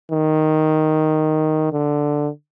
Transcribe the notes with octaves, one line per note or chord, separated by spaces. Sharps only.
D#3
D3